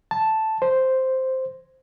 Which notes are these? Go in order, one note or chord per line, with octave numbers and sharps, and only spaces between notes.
A5
C5